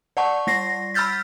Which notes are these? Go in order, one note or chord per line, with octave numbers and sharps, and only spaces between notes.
D5 F#5 A5 C#6
G3 A#6 C7
B5 E6 F6 G6 A6 B6